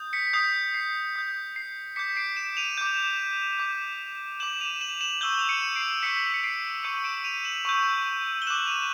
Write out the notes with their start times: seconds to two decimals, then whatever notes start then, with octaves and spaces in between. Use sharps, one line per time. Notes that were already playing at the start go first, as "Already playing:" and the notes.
Already playing: D#6 G6
0.13 B6 C#7
0.33 D#6 G6 C7
0.74 C7
1.15 D#6 G6 B6
1.56 C7
1.96 D6 G6 B6 C#7
2.16 C7 D7
2.36 D7 E7
2.57 D#7 F7
2.78 D6 G6
3.58 D6 G6
4.40 D6 G6 E7 F#7
4.61 D#7 F7
4.81 E7 F#7
5.01 E7 F#7
5.21 C#6 E6 G6 G7
5.39 F7 G7
5.49 C#7 D#7
5.76 C7 D7
6.03 C#6 E6 G6 B6 C#7
6.34 C#7
6.44 C7 D7
6.83 C#6 E6 G6 C#7 D#7
7.04 D7 E7
7.24 D#7 F7
7.45 E7 F#7
7.65 C#6 E6 G6
8.42 G7
8.47 D6 F#6 E7 F#7
8.66 D#7 F7